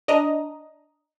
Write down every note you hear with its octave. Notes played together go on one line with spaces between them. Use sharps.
D4 D#5 A#5